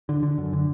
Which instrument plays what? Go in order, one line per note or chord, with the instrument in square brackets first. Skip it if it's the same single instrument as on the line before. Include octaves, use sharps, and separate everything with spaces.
[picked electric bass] D3
D3
F#2
D3